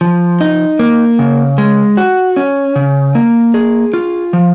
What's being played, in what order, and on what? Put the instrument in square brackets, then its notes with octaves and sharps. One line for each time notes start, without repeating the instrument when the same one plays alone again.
[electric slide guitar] F3
D#4
A#3
C#3
G#3
F#4
C#4
C#3
A#3
G#4
F4
F3